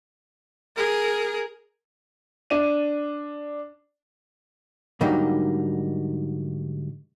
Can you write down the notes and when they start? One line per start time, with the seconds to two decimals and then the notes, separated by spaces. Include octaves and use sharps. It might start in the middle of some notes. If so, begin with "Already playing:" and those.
0.76 G#4 A#4
2.50 D4 D#7
5.01 G#2 D3 F#3 G3 A#3 D#4